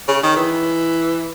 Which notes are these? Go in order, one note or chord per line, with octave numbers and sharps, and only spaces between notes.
C#3
D#3
E3